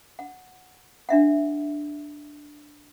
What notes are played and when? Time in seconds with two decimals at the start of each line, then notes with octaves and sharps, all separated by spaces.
0.19 F#5
1.09 D4 E5 F#5